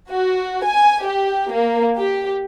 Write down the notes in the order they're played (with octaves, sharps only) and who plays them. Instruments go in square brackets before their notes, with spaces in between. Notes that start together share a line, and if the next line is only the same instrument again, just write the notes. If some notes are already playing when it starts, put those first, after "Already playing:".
[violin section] F#4
G#5
G4
A#3
G4